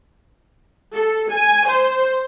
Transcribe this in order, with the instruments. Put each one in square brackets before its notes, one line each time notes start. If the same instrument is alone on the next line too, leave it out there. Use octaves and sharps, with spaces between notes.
[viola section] A4
G#5
C5